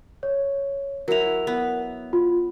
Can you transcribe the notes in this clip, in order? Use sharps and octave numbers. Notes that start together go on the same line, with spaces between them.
C#5
F#3 E4 A#4 F7
B3
F4